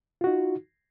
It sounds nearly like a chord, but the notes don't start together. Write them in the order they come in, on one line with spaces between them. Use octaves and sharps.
F4 F#4 D#4